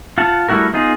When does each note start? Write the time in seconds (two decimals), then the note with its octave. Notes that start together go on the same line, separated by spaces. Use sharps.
0.18 F4 F#5 A5
0.49 G3 A3 E4 F#4 A#4
0.73 B3 D#4 F4 G#4